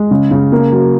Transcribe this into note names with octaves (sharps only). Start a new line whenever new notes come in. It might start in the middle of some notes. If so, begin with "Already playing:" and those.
Already playing: G#3
C#3
C#3
A#3
F#3